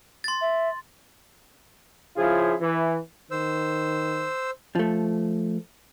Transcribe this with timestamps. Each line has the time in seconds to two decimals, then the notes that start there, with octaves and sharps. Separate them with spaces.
0.24 C6 A6
0.41 E5
2.16 C#3 F3 C#4 E4 F4 G#4
2.61 E3
3.31 D#3 C5 E6
4.75 F3 A3